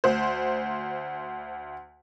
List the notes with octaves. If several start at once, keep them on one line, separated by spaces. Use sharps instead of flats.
D2 C5